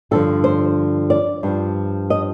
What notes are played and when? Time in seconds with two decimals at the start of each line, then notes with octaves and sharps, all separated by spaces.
0.11 G2 D3 F3 A4
0.44 C5
1.10 D5
1.43 G2 F3
2.10 D#5